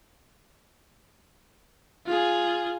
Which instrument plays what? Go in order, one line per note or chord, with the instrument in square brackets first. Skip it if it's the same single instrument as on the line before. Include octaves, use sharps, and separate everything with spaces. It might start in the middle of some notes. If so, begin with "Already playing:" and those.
[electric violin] F4 G#4